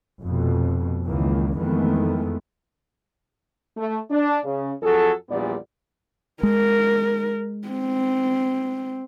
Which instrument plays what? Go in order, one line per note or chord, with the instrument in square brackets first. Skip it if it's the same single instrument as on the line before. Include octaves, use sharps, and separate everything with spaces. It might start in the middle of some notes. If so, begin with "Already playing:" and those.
[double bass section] F1 F2 B2
C#2 D#3 E3 A#3
F2 D#3 E3 G#3 A3 B3
[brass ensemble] A3
D4
C#3
F2 F#3 G#4 A4
A#1 E2 A#2 G3 B3 D5
[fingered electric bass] G#3 [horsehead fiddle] A#4
[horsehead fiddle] C4